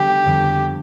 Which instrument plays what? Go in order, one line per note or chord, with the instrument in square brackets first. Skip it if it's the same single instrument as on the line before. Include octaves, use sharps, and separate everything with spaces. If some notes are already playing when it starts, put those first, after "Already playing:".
Already playing: [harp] D3 G3 B3 [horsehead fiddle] G4
[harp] F2 D3 G3